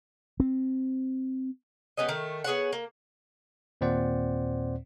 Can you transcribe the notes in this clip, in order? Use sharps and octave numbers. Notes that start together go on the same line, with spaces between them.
C4
G3 B3 C#4 D#5
D#3 A3
B3 G#4 C#5 F#5
A#3
D#2 A#2 C4 C5 D5 F#5